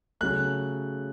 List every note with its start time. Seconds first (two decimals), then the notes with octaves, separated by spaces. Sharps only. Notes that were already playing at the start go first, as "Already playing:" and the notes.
0.21 C#3 F#3 A3 F#6